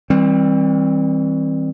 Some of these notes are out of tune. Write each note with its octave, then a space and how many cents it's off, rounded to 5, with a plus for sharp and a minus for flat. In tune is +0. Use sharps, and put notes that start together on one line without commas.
E3 -30 G3 +15 C4 +15